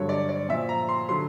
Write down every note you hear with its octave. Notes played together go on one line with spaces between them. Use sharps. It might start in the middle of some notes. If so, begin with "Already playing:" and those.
Already playing: G2 D3 F#3 C#5
D5
D5
A#2 F3 E5
A#5
C6
D3 F#3 C6